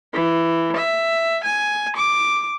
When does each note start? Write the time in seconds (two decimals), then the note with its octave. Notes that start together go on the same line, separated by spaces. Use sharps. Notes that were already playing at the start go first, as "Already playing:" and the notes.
0.14 E3
0.76 E5
1.44 G#5
1.97 D6